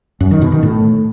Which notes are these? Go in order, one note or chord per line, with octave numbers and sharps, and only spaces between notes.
F#2
D#3
B2
D#3
A2